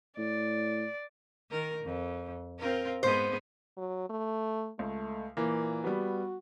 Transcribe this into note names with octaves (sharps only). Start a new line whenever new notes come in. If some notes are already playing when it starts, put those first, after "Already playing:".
A2 D5
D#3 A#4
F2
C4 F4 A#4
G#2 B3 G#4 C5
F#3
A3
C#2 A3
A#2 E3 A#3
G3 B3 F#4